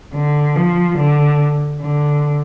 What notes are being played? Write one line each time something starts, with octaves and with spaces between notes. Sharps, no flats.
D3
F3
D3
D3